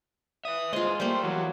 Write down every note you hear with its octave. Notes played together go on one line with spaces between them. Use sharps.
B4 E5 D#6
G2 G#3 F4 C5 D#5
G3 A3 A#3 C5
E3 F#3 B3